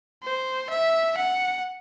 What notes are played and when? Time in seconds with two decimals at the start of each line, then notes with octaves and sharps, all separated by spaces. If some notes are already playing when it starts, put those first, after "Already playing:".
0.23 C5
0.70 E5
1.17 F#5